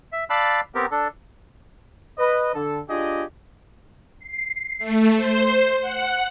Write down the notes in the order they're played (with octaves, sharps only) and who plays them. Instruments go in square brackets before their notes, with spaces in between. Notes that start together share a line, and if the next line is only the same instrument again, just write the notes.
[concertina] E5
D5 F5 A5 B5 E6 F#6
B3 C4 G4 A#4
D4 A4
[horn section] B4 D#5
D3 A4
D4 F4 G4 G#4 D#5
[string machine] C7
A3
C5
F#5